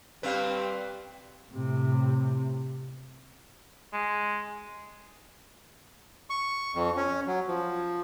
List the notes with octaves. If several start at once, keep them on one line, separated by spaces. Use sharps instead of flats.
G2 G3 C4 B4 F5
A2 C3
G#3
C#6
F2
C#4
F#3
F3